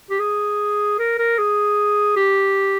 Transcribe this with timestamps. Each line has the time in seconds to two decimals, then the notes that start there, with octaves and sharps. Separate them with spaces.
0.10 G4
0.19 G#4
0.99 A#4
1.18 A#4
1.38 G#4
2.16 G4